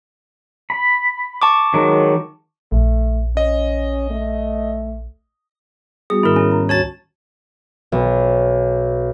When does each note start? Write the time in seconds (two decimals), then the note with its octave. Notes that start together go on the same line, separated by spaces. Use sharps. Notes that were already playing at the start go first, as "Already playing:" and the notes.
0.70 B5
1.42 A5 C#6 D6
1.74 D#3 F#3 G#3
2.72 A#1 A3
3.37 C#4 D#5
4.10 A3
6.10 G3 B3 F#4 G#4
6.23 G#2 D#3 E4 A#4
6.36 C#4
6.51 A#5
6.69 D2 F#4 C#5 A5 A6
7.92 B1